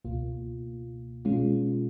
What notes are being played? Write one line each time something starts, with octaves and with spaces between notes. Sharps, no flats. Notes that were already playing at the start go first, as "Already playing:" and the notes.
C#2 B2 A#3 F4
B2 G#3 C#4 F4